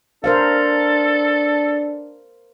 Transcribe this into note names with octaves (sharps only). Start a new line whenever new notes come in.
D4 A4 A#4 C5 F5